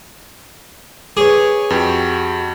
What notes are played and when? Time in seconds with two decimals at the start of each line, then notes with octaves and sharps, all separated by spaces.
1.17 G#4 B4 C#5 D6
1.70 F2 F#4 G4